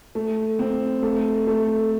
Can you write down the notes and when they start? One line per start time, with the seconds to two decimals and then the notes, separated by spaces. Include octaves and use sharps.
0.15 A3
0.59 C4
1.03 A3
1.47 A3